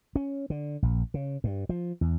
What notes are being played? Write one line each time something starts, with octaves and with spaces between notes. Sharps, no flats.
C#4
D3
A#1
C#3
G2
F3
E2